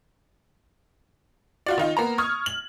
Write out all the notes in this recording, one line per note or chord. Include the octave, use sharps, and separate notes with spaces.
F4 F#4 D5
D#3 D#4 F4
A#3 B3 A#5
C#6 D#6 F6 G#6
F#7